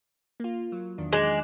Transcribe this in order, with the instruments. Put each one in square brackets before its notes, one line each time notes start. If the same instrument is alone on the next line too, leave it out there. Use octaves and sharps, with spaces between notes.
[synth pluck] A#3 F4
F#3
E2 D#3 D4
[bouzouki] G#3 [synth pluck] D6 F#6 E7